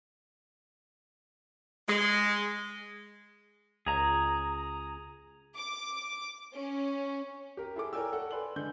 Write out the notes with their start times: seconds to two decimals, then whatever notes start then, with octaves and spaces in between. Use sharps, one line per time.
1.88 G#3
3.86 C#2 G#4 A#5
5.56 D6
6.54 C#4
7.57 G4 A#4
7.76 E4 G#4 A4 D6
7.93 A#4 C#5 D5 G5 G#5 E6
8.12 A4 F#5
8.31 B4 D5 G#5 C6 F#7
8.56 D3 G#3 G6